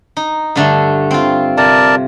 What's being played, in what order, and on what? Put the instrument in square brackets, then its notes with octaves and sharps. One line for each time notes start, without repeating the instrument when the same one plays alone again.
[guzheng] D#4
G2 D3 A3
C4 F4
[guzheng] C3 [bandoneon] A#4 D5 A5